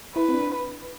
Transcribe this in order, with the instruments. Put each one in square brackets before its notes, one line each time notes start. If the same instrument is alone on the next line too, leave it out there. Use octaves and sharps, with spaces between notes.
[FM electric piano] E4 [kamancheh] B4
[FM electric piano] C4
D4